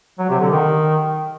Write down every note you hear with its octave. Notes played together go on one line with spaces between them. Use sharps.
F#3
C3
D3
D#3